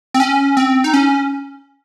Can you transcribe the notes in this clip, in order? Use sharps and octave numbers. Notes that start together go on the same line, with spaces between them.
C4
C#4
C4
D#4
C#4